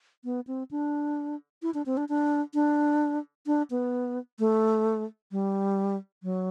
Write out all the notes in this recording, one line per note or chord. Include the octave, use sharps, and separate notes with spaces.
B3
C4
D4
E4
D4
C4
D4
D4
D4
D4
B3
A3
G3
F#3